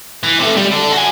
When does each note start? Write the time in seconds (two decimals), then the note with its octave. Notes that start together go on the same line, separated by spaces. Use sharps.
0.23 E3
0.40 C3 A3
0.57 G3
0.72 D4 A4
0.93 F#4 G#5